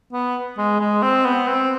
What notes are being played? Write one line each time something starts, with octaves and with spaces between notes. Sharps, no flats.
B3
G#3
G#3
C4
B3
C4